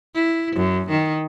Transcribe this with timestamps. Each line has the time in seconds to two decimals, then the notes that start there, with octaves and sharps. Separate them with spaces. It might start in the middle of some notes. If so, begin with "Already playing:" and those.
0.15 E4
0.56 F#2
0.90 D#3